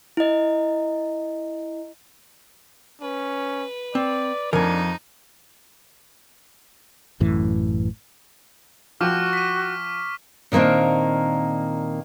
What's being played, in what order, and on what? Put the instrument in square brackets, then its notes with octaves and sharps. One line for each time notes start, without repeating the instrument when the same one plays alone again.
[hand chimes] E4 D#5
[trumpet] C#4 [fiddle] B4
[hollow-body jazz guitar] C4 [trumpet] D5
[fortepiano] F2 [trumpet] D4 [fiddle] D#4 [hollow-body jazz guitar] A#4 G#5
[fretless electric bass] A1 F#2 A2 E3
[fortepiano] F3 G5 [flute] F#4 [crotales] C#6 D6 F6
[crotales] B6 D#7
[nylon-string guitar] A#2 D#3 A#3 C4 D4